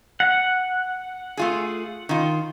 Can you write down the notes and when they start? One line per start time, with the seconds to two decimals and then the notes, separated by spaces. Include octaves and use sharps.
0.20 F#5
1.37 A3 F4 G#4
2.09 D#3 F4